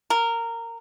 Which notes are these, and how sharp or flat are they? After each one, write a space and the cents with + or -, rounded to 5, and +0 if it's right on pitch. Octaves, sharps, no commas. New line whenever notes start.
A#4 -15